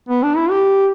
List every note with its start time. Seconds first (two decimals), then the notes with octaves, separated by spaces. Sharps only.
0.09 B3
0.23 D4
0.36 E4
0.51 G4